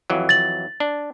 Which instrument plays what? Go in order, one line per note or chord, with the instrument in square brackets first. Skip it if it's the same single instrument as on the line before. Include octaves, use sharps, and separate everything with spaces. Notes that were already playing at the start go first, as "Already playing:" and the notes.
[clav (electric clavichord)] F2 E3 F#3
[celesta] A6 F#7
[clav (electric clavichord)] D4